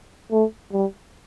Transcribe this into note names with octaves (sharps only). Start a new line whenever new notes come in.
A3
G3